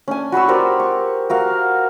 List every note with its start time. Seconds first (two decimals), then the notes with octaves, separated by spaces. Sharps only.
0.08 C#4 D4 G#5
0.32 F#4 B5 C#6 E6
0.48 G4 A#4 C5 D5
0.80 C#6
1.30 F#4 A#4 F5